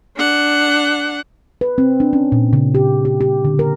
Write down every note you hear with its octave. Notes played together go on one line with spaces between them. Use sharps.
D4 F#5
B4
C4
D4
C#4
A#2
C#3
G4
G4
G4
D3
A#4